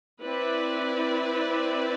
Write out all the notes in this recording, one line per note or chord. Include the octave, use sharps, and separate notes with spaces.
C4 E4 B4 D5